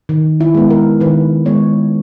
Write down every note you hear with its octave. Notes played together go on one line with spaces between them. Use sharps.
D#3
E4
G#3 B3
A#4
D#3 B4
G#3 B3 C#5